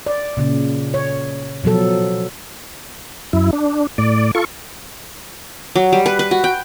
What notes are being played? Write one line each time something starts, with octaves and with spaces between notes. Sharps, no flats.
D5
A#2 C#3
C#5
B2 F3 F#3 A4
F#2 E4
D4
A2 D5
F4 A4 C#6
F#3
G3
B4
B4
F#4
G5